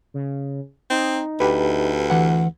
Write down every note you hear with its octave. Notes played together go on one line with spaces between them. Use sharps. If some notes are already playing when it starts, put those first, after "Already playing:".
C#3
C4 D#4
D2 G4 B4
E3 F#5